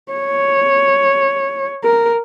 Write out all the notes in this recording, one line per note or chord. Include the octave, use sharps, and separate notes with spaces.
C#5
A#4